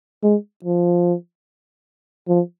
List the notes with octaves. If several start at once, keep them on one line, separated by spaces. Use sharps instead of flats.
G#3
F3
F3